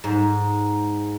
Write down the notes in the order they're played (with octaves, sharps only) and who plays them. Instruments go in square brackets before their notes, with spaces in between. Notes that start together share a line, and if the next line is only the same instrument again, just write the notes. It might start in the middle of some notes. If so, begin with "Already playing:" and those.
[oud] G#2